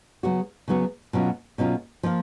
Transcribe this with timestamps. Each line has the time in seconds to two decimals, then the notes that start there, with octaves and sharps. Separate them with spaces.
0.23 C#3 F#3 B3 F#4
0.68 C#3 F#3 B3 F#4
1.13 B2 F#3 C#4 F4
1.58 B2 F#3 C#4 F4
2.03 F3 A#3 F4